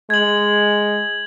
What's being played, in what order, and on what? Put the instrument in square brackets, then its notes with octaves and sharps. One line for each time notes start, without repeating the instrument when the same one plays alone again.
[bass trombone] G#3 [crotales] G#6 F#7